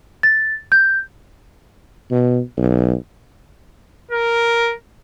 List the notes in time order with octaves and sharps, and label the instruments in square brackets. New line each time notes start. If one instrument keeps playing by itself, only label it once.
[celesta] A6
G6
[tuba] B2
B1
[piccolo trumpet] A#4